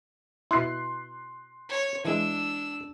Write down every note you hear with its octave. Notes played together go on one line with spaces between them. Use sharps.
B2 E4 C6 F#6 C7
C#5
E3 G#3 D4 E6